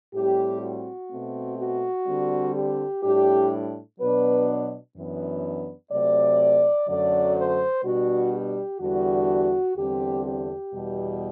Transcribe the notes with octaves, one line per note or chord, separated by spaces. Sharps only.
A2 G3 C4 G4
F#4
B2 A3 C4
F#4
D3 G3 C4
G4
A2 G3 D4 G4
B2 F#3 B3 D4 B4
F#2 E3 B3 D4
C3 F#3 A3 D5
F#2 D3 F#3 A3 D5
C5
B2 G3 D4 F#4
G4
E2 D3 G3 D4 F#4
E2 D3 G3 C4 G4
G4
E2 B2 G3